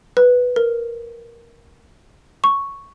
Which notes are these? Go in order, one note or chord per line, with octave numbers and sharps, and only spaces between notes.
B4
A#4
C#6